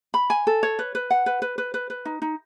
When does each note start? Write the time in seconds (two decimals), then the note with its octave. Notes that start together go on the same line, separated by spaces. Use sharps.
0.14 B5
0.30 G#5
0.47 A4
0.63 C#5
0.79 B4
0.95 B4
1.10 F#5
1.26 B4
1.42 B4
1.58 B4
1.74 B4
1.90 B4
2.05 D#4
2.22 D#4